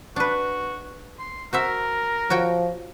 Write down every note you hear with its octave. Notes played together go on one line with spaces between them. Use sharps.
D4 F#4 B4
C6
F#4 A#4 C5 E5
F3 F#4 C#5 G5